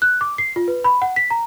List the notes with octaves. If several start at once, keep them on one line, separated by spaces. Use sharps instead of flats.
F#6
D6
C7
F4
B4
B5
F#5
B6
A#5